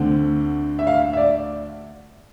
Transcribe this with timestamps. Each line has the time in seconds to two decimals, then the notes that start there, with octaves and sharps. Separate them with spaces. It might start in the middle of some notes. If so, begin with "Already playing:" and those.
Already playing: D2 D3 A3 C4
0.79 E5
0.87 F5
1.13 E5
1.17 D5